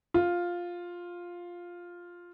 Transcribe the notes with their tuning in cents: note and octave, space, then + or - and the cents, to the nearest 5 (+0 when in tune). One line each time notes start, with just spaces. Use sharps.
F4 +5